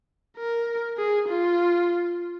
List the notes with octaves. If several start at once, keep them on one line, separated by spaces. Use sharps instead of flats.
A#4
G#4
F4